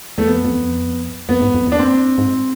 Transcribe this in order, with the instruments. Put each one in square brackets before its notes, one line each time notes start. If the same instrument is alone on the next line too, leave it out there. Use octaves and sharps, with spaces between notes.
[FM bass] E2 [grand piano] A3
[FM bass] F2 [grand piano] B3
[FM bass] F2
E2
F2
[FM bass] F2 [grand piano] B3
[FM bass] G#2
F2
E2
[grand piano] D4
C4
[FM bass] G#2